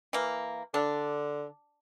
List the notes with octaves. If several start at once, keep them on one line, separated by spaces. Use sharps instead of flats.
E3 A#3
D3 D4